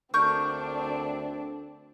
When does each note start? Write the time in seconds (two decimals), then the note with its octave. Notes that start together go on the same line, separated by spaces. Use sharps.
0.14 D2 C4 D4 A#4 C#6 G6